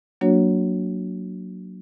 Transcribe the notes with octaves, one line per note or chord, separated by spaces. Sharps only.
F#3 A#3 D4 F#4 C#5